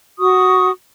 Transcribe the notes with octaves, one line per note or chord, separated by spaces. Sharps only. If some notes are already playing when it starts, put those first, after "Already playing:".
F#4 C#6 D#6